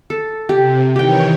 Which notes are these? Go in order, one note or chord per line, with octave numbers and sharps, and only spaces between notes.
A4
C3 G4
D#3 E3 G4 C#5 G5